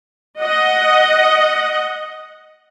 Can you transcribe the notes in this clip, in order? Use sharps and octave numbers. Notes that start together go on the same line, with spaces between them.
D#5 F#5